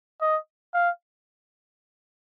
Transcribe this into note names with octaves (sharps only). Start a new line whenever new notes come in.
D#5
F5